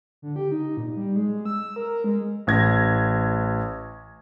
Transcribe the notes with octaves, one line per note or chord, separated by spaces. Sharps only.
D3
G4
D#4
A#2
G3
G#3
E6
A#4
G#3
A1 G#6 A#6